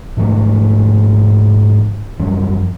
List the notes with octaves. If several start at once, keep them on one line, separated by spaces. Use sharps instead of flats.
G#2 F3 A3
F#2 F3 G3